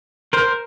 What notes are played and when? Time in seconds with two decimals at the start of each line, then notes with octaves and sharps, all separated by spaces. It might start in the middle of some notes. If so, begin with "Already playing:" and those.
0.33 A#4 C5
0.48 A#4